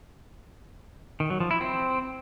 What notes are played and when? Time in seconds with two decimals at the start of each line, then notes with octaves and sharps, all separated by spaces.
1.20 D#3
1.30 F#3
1.40 F3
1.51 E4
1.61 C4